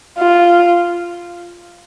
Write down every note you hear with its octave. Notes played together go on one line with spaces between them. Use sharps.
F4